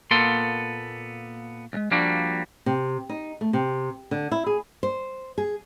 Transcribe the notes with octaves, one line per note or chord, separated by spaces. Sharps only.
A#2 A#3 B3 A4 C6
C#2 G#3
F3 G3 A#3 D4 F#4
C3
D#4
A3
C3
D3
E4
G#4
C5
G#4